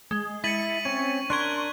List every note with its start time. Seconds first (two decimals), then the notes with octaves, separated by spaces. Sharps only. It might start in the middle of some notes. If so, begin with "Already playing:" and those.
0.11 G#3
0.44 E4 A6 B6 C#7 D#7 F#7
0.85 C4 C#4 C#5 C#6
1.30 D4 A#4 C6 C#6 F#6 G#6 G7